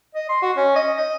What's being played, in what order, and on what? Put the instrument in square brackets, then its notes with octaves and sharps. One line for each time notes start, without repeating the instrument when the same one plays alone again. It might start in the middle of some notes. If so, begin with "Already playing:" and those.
[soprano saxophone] D#5
C6
F#4
C#4
D#5
D#5